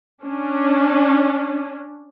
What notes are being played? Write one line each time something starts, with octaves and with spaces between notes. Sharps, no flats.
C#4 D4